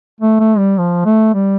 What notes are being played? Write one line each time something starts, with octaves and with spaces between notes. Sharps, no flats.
A3
A3
G3
F3
A3
G3